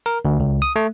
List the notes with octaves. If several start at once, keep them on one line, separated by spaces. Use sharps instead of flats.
A#4
D2
C#2
D#6
A3